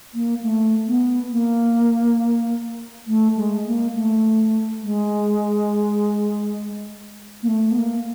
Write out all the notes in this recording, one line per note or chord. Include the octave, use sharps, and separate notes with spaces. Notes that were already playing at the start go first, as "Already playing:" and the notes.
A#3
A3
B3
A#3
A3
G#3
A#3
A3
G#3
A#3
A3
B3
A#3